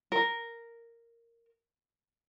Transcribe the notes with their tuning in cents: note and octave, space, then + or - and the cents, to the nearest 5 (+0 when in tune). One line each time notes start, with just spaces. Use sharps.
A#4 -5